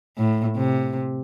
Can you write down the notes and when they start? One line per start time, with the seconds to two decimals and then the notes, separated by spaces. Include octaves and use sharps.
0.18 A2
0.57 C3